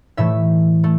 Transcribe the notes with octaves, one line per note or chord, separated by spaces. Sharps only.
A2 E3 A3 E5
A3